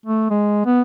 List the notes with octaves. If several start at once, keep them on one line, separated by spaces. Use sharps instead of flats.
A3
G#3
B3